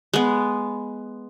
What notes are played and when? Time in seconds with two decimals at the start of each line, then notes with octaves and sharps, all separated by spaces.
0.14 G#3 B3